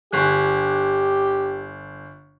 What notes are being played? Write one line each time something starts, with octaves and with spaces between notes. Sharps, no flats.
G1 G4 F#6